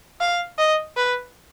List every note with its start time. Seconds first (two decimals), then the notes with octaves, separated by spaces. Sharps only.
0.21 F5
0.59 D#5
0.97 B4